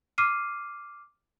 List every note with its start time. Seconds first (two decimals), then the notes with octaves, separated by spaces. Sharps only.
0.18 D6 F6 C7 D#7